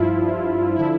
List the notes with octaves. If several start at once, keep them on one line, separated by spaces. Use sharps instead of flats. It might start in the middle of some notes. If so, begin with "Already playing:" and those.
Already playing: G2 F3 E4 F4
G2 F3
D3 F3 E4